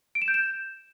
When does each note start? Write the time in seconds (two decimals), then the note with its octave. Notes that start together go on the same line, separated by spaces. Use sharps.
0.15 D7
0.22 E7
0.28 G6
0.34 E7